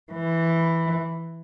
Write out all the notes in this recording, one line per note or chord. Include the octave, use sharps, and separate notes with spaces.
E3